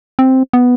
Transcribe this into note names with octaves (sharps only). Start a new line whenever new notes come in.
C4
B3